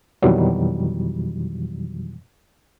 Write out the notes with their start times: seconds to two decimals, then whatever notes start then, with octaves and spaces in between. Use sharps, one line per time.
0.22 F2 B2 D#3 E3 F#3 G3